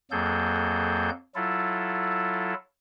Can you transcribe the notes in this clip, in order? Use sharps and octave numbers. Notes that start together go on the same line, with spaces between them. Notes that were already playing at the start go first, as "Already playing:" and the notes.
F2 F#3 A#3 G#4 A4 G6
F#3 E4 F4 A4